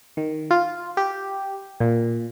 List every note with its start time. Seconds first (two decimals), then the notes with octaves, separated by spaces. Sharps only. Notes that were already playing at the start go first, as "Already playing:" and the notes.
0.17 D#3
0.51 F4
0.97 G4
1.80 A#2